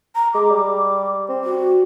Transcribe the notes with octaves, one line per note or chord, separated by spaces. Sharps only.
A#5
G#3 D6
G3
C4
F#4